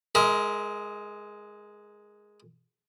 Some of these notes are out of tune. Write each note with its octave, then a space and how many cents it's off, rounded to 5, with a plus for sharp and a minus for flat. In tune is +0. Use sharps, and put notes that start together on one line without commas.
G#3 +0 A#4 +0 E5 -45